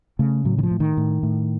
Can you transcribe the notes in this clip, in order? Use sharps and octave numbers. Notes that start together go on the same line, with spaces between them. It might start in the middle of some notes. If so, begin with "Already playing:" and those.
C#3 A3
A2 F#3
D#3
F3
A2
D#3
A2
A2